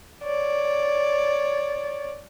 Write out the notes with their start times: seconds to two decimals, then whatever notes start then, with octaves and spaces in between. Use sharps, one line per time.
0.24 C#5 D5